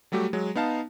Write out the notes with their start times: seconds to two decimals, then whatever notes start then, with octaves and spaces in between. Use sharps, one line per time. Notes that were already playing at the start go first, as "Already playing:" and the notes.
0.12 F#3 G3 A3 F#4 G4
0.33 F#3 G#3
0.55 B3 D#4 F5 A5